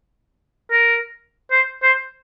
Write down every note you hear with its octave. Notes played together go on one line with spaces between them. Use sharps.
A#4
C5
C5